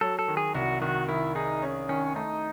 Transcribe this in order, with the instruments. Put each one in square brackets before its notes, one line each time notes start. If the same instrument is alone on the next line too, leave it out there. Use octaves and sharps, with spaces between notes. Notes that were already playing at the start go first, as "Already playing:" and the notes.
[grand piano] F#3 [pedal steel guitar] A4
[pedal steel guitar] A4
[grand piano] D#3
[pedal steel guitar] G#4
[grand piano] C2 [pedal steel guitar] F#4
[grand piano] D#3 [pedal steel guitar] F#4
[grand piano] D#3 [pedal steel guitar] E4
[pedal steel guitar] D#4 [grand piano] G#4
[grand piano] C#4
[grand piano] D#3 [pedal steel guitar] C#4
[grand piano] A3 [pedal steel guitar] D#4